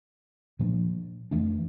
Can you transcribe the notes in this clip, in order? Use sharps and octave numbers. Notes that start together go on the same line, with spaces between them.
A#2 F3 A#3 D4
F2 E3 A3 D4